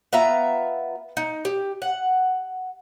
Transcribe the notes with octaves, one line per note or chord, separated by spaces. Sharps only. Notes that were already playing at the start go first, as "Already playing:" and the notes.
B3 F4 E5 A#5
D#4
G4
F#5